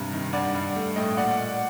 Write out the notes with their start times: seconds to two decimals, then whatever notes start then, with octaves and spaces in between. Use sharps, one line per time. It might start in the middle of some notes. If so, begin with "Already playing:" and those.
Already playing: G2 C3
0.12 D#3
0.33 G2 D5 F#5
0.55 G2
0.76 A3
0.96 A2 D#5 G5
1.17 A#2 D5 F#5